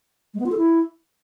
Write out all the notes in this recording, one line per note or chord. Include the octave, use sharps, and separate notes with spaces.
G#3
B3
F4
A4
E4